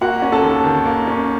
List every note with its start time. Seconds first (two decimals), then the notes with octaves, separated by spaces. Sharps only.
0.01 A#3 F#4 F#5
0.22 C#4
0.32 A4 A5
0.43 D#2
0.64 D#3
0.86 A#3
1.07 C#4